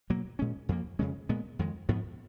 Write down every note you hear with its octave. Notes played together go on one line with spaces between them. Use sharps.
B2 F#3 A#3
A#2 G#3 C#4
F2 F3 A#3
F2 C#3 G#3 C#4
A#2 G#3 B3
F2 D#3 G#3
G#2 F3 B3